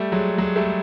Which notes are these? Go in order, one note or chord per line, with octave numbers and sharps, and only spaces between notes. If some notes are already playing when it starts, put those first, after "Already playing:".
Already playing: G3 A3
F#3 G#3
F#3 G#3
G3 A3